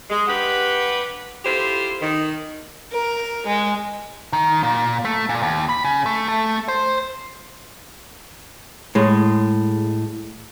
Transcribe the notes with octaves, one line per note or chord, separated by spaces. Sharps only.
G#3
G2 G4 B4 F#5
E4 F4 G4 A4 C5
D#3
A#4
G#3
D#3
A#2
A3
A#2
D#2
B5
C#3
A3
A3
C5
A2 G#3